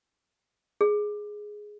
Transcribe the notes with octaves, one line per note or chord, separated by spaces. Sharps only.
G#4